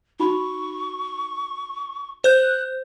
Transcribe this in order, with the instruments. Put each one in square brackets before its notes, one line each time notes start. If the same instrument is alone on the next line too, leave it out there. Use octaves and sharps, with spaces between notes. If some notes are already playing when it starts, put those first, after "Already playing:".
[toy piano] D#4 F#4 B5 [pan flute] C#6
[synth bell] C5 G6 [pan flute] F#6